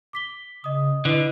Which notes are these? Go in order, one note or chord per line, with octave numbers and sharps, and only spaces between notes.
D6 B6 G7
C#3 D#5 D#6
D3 E4 B4 D#5